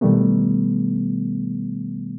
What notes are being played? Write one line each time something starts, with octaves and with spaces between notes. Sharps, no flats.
B2 D#3 G3 A3 B3